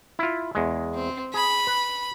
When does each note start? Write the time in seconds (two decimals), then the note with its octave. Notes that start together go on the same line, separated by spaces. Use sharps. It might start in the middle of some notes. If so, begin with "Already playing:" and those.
0.19 E4 F4
0.55 E2 G#3
0.94 C4
1.34 G#4 B5
1.67 B4